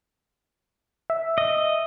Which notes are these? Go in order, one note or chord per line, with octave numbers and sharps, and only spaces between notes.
E5
D#5